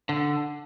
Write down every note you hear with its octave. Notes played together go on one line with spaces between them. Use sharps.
D3